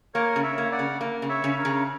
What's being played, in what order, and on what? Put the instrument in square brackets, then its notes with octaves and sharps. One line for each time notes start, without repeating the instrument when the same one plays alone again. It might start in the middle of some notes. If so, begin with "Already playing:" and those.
[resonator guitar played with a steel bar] A#3 [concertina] A#4 C#5
[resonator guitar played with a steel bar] C#3
[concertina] C#5 E5
[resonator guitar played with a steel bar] A#3
[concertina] D5 F#5
[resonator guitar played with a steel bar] C#3
A#3
C#3
[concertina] C#5 E5
[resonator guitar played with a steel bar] C#3
[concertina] A#4 C#5
[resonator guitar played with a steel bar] C#3